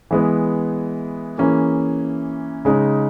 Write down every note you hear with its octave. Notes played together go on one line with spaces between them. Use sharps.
E3 G#3 B3
E3 A#3 C#4 G#4
C#3 G#3 D#4